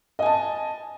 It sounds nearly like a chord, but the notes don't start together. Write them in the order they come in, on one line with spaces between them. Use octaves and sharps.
D#5 G#5 A5